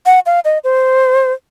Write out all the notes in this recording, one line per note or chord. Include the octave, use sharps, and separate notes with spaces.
F#5
F5
D#5
C5